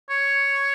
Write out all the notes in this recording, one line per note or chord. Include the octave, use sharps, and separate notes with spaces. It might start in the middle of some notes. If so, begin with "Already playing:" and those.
C#5